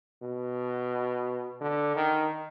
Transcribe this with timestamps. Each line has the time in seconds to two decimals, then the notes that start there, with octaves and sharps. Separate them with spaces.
0.23 B2
1.61 D3
1.96 D#3